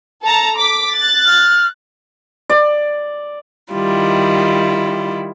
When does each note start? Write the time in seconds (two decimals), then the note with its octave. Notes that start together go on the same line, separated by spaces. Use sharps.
0.23 A4 A5 A#5
0.57 D6 B6
0.94 F#6 A6
1.26 F6
2.49 D5
3.73 D#3 G3 E4 F4